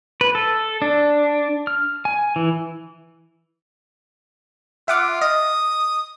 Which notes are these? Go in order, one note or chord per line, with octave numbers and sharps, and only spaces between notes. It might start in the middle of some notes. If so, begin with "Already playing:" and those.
B4
A4
D4
F6
G#5
E3
F4 E5 F#5 D6
D#5 D#6